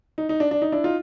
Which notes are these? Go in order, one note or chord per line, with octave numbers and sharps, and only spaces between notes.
D#4
D#4
D4
D4
D#4
D4 E4
D#4 F4